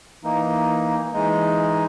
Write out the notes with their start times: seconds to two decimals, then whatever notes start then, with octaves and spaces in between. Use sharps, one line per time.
0.23 E3 A#3 D#4
1.13 E3 G#3 D#4